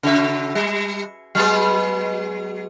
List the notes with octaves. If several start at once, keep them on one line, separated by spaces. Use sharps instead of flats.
C#3 F#4 E5
G3
F#3 G#3 B3